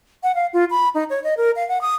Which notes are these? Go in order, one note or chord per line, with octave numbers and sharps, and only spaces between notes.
F#5
F5
F4
B5
D#4
C#5
D#5
A#4
F5
F#5
D#6